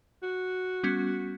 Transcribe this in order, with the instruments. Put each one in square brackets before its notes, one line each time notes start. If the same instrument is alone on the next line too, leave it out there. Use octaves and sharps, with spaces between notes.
[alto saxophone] F#4
[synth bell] G3 B3 C#4